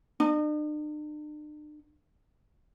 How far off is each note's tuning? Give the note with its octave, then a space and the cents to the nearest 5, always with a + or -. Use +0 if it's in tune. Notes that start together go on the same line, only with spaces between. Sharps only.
D4 +45